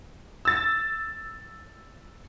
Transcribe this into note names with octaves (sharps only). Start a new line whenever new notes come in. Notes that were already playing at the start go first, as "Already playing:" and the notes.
E6 A6